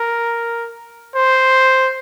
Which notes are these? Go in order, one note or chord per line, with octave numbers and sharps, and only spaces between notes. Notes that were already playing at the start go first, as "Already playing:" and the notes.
Already playing: A#4
C5